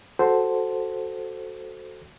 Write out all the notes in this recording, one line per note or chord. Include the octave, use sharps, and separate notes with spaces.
F#4 A4 C5